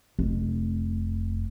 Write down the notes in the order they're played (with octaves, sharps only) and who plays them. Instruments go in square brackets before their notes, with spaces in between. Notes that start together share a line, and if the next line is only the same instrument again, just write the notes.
[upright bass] F1